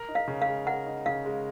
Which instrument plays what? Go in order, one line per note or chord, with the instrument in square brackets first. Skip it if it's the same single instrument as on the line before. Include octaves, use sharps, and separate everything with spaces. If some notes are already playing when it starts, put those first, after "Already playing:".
Already playing: [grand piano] A#4
D#4
[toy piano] F5
[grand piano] C#3
[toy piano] F5
[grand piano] G#3
[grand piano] A#4 [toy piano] F#5
[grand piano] D#4
[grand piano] C#3 [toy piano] F5
[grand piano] G#3